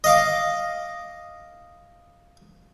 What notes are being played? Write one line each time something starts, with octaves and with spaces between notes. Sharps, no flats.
D#5 F5 D6